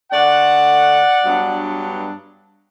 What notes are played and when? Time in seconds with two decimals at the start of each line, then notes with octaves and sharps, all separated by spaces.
0.12 D3 A3 D4 D5 F#5
1.24 G2 F#3 B3 D4